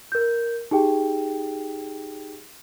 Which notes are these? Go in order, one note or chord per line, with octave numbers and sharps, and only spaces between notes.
A#4 G6
D#4 G4 G#4 G5